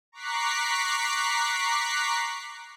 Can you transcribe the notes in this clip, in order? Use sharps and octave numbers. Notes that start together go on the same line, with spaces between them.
A#5 C#6 D6 F#6 B6 C7